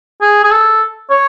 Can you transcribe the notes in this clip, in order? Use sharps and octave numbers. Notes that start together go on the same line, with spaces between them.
G#4
G#4
A4
C#5